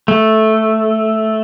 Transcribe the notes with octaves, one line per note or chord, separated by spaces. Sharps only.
A3